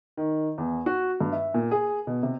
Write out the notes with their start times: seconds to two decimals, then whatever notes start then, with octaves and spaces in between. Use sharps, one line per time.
0.17 D#3
0.58 E2
0.86 F#4
1.21 G2
1.32 E5
1.54 A#2
1.71 G#4
2.07 B2
2.23 C3